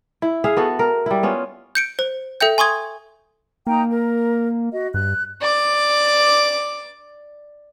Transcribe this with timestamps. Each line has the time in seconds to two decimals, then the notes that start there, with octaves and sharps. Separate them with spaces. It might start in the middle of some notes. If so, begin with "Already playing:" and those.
0.22 E4
0.44 G#4 E5 F5
0.57 B3 F#4 A4
0.79 A#4
1.06 G3 E4
1.23 B3 C#4 F4
1.75 G6 C#7 D7
1.99 C5
2.41 A4 E5 G5 G6
2.58 G#5 C6 C#6 D#6 G#6
3.67 A#3 D#4 G5 A#5
3.90 A#4
4.72 F#4 D#5
4.94 G2 F#6
5.42 D5 D6